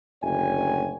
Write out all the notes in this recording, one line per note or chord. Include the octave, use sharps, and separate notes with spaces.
F#1 D2 D3 C#5 G5 G#5